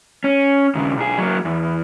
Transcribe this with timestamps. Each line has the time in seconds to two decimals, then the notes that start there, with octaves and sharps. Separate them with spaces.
0.24 C#4
0.75 D#2 C#3
0.97 B1 G#4
1.18 F#3 A#3
1.45 E2